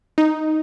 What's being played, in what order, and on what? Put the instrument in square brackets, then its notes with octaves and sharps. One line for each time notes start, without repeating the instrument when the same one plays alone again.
[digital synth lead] D#4